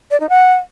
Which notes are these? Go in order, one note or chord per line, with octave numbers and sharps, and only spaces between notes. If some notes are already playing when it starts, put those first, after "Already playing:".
D5
D#4
F#5